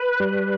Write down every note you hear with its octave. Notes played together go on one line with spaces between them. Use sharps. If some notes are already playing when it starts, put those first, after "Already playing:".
Already playing: B4
G3